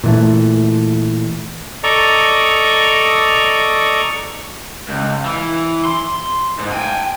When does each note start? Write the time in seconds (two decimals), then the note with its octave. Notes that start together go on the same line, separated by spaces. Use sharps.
0.04 A#2 E3 A3
1.83 A4 D5 D#5 A#5 C#6
4.89 C#2
5.25 E3
5.85 C6
6.60 G#2
6.73 G5 G#5